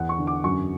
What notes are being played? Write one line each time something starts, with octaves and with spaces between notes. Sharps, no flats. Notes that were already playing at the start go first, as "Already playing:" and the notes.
Already playing: E2 F#5
C#6
D3
D6
F#2 C#6